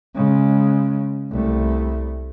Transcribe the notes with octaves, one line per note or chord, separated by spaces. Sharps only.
C#3 G#3
C2 A3